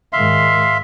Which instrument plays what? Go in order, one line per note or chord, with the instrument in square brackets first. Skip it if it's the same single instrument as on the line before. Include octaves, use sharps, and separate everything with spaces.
[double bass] G#2 D#3 [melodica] E5 F5 C6